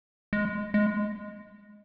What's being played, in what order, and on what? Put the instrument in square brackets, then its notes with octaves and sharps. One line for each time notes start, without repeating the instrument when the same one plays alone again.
[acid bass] G#3
G#3